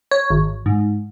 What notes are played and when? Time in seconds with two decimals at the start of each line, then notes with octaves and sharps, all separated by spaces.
0.11 C#5
0.30 G#1
0.66 G#2